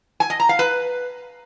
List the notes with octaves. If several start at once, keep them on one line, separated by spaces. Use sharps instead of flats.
G#5
D#5
A#5
F5
B4